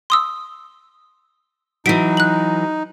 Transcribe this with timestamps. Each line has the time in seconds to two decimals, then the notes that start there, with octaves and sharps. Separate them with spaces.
0.10 C6 D#6 E6
1.86 E3 F#3 D#4 B6 D7
2.17 F#6 F#7